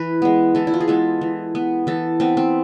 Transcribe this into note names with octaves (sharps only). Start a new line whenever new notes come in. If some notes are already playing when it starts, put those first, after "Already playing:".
Already playing: E3 B4
G#3 B3
E3 A4
E4
F4
G#4
G#3 B3 A4
E3
B3
E3 A4
B3 C4
C4